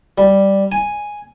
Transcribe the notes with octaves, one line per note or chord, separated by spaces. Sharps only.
G3
G#5